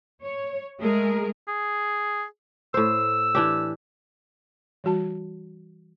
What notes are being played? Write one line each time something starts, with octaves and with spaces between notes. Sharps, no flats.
C#5
G#3 A3 G#4 A#4
G#4
A2 C5 E6
E3 D4 G4
E3 G3 F#4 A5